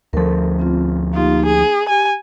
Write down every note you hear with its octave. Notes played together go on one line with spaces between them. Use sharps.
D2 F3 A4 A#4
C4 F4
A#3 D#4 F4 G4
G#4
G4 G#5